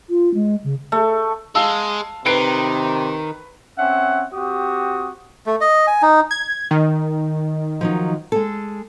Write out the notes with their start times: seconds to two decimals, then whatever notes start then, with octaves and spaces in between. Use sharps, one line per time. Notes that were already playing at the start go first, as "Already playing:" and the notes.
0.10 F4
0.34 G#3
0.64 C#3
0.92 A3
1.55 G#3 F5 A5 E6
2.25 C3 D#3 B4 C7 D7
3.78 C4 C#4 E5 F#5
4.33 C4 F#4 G4 D#6
5.46 A3
5.61 D#5
5.87 G#5
6.02 D#4
6.31 G#6
6.71 D#3
7.81 F3 F#3 D#4
8.32 G#3 A4